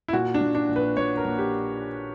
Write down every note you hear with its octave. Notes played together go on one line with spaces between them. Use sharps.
E4
A#2 F#4
D4
A#2
D4
A#1
B4
A#2 C#5
A#4
A#1
G4